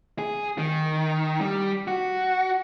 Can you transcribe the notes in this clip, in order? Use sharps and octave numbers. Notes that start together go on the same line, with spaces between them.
G#4
D#3
G3
F#4